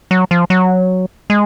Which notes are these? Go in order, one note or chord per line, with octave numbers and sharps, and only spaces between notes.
F#3
F3
F#3
G#3